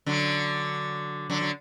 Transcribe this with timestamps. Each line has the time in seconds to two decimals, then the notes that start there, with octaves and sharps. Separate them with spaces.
0.06 D3 F#3
1.30 D3 F#3
1.41 F#3